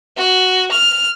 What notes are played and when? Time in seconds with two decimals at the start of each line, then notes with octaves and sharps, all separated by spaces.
0.17 F#4
0.72 F6